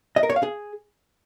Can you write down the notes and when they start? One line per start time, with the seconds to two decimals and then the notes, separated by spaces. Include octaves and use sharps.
0.16 D#5
0.23 A#4
0.30 C#5
0.36 F5
0.43 G#4